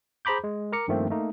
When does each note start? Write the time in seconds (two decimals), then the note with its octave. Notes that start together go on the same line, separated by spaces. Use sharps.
0.25 G#4 C5 A#5 B5 D6 G6
0.44 G#3
0.72 A#4 A#5 D6 C#7
0.88 G2 D#3 F3 A3 A#3 C4
1.10 A3 A#3 D#4